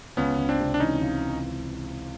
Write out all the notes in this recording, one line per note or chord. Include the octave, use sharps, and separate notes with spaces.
C#2 B3 C#4
C#2
C4 D4
C3
D4
E3 C#4 D#4
C#2